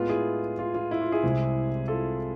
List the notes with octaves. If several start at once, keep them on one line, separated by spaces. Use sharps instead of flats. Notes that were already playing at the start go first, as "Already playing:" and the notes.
Already playing: A2 G#3 B3 F4
E4 G#4
F4
F4
E4
F4
E4 G#4
C2 C3 G#3 C4
F4 A4